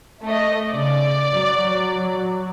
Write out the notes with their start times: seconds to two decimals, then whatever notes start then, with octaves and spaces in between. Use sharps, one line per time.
0.23 A3 D#5
0.71 C#3 D5
1.34 F#3